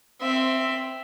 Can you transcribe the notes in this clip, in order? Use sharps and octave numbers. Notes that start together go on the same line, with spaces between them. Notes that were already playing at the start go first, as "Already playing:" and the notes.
C4 E5